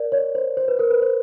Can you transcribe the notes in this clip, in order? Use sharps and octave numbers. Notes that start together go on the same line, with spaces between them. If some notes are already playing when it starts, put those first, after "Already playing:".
Already playing: A#4 D5
C#5
C5
C5
B4
A#4
B4
C5